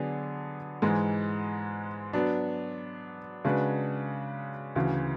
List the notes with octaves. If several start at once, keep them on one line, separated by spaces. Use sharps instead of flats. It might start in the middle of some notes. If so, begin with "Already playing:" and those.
Already playing: D3 F#3 B3 D4 G#4
G#2 E3 G#3
F#3 B3 D4
C#3 G#3 D4 F#4 B4
D2 C#3 E3